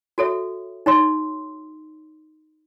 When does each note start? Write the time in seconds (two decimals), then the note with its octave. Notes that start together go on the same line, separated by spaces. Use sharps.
0.18 F#4 A4 C#5 E5
0.86 D#4 C#5 C6